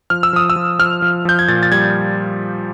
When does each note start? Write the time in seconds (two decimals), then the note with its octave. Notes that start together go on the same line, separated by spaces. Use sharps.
0.10 F3 F6
0.23 E6
0.33 F3 D#6
0.50 E6
0.56 F3
0.79 F3 F6
1.02 F3
1.25 F3 G6
1.39 G#6
1.48 A#2 A6
1.63 A6
1.72 G3 G#6